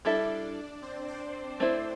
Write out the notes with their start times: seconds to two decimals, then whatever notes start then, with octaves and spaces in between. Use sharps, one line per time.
0.05 G3 D4 E4 A4 D5 E5
0.82 C4 C5
1.08 C4 C5
1.60 A3 C4 E4 C5